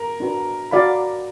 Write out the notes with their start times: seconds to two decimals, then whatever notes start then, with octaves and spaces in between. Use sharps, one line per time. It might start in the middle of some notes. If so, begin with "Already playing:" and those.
Already playing: A#4
0.20 D4 F#4 B4
0.71 F#4 D5 F5 B5